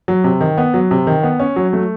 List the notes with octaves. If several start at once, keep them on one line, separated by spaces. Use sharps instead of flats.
F#3
C3
D#3
B3
F#3
C3
D#3
B3
C#4
F#3
A3